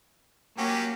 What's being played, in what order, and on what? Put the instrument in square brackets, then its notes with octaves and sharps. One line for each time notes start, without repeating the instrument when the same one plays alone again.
[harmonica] F#3 C#4 G4 [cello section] A#3